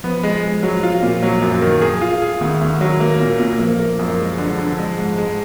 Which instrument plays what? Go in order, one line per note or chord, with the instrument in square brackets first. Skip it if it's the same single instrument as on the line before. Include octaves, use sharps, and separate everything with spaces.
[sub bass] F3 [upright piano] B3
[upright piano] G#3
G#3
F#3
F4
A#2
F#3
F#2
D#3
G#4
F4
G#4
[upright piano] D2 [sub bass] D#3
[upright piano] D2
F#3
A#3
A#2
A#2
[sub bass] F3 [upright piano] A#3
[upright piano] A#3
F#2
G#3
D3
D3
G#3
G#2
G#3